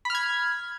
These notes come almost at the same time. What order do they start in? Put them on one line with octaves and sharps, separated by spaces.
B5 F6 G#6